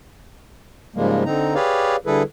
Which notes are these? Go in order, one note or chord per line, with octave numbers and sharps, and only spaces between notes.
G#2 C#3 F3 G3 G#3 A#3
D3 C4 D#4 A#5
G4 G#4 B4 C#5 D5 F5
D3 G3 E4 G#4 A4 B4